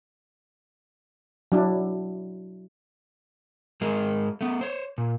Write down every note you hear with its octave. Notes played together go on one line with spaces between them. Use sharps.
F#3 D4 E4
G#2 G#3 G#4 A#4 D#5
A3 B3
C5 C#5
A#2